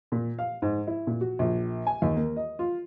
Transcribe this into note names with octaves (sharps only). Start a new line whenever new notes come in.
A#2
F5
G#2
E4
A#2
F#4
A#1
G#5
D#2
A#3
D#5
F4